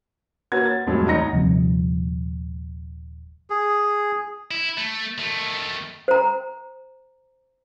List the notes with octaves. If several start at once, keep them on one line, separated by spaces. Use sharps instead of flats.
A#3 F#4 B4 C#5 F#5 G#6
A6
C2 F2 A2 F#3 G#3
E2 A2 D#4 A#5 A#6 C#7
D#1 C3 F3 C4
G#4
E4
A3
D#3 A3
C5 A#5